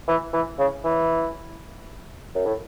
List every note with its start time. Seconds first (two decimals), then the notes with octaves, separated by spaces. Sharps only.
0.08 E3
0.33 E3
0.59 C#3
0.84 E3
2.35 F#2
2.46 A2